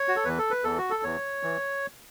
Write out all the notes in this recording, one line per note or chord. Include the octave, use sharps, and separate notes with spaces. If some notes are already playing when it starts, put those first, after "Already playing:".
Already playing: C#5
F#4
A4
E2 E3 B4
A4
B4
E2 E3 A4
F#4
A4
E2 E3 C#5
E3